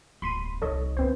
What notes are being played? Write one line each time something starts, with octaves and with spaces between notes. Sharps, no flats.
D1 G1 B5 C6 D#7
C2 D#4 A4 C#5 D#5
D2 G2 B3 C4 C5